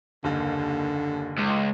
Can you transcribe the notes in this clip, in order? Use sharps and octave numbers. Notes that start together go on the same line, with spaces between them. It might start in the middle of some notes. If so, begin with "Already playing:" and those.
F#1 D#2 D3
C#2